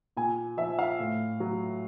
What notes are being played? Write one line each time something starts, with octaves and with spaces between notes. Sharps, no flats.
A#2 G#5
F3 E5
F5
A2
F#3